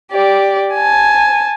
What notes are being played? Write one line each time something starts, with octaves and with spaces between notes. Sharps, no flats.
G4 D5
G#5 A5